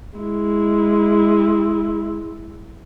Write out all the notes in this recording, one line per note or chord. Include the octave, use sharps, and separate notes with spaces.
G#3 E4